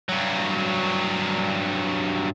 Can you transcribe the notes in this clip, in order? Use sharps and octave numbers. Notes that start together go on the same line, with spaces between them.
G2 F#3